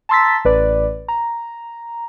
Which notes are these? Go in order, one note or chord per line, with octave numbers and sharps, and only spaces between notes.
A5 A#5 C6 E6 A6 B6
A1 B4 D5
A#5